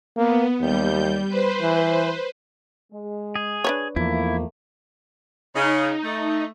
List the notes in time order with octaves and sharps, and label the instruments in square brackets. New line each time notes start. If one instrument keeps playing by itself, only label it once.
[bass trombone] A#3 [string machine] B3
[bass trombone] D#2 [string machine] G3 G6
[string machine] B4 C5
[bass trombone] E3
[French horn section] G#3
[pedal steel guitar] G#4
[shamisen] D4 B4 C#5
[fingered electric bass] E2 F3 [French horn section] D#3 A3 A#3 [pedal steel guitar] E4
[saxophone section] C#3 [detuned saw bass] D#4
[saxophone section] A3